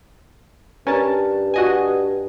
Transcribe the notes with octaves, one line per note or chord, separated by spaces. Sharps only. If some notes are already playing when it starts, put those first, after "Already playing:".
G2 C#4 A#4 A5
F#4 D#5 G#5